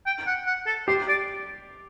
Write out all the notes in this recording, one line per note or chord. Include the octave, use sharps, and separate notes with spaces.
G5
F#5
F#5
A4
G4 C5
D5